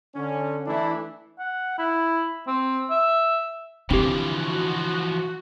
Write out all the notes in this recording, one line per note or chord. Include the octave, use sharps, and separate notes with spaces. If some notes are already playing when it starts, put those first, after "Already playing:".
D3 C#4
E3 A3 D4 E4
F#5
E4
C4
E5
D3 E3 F3 C4 G4
F#4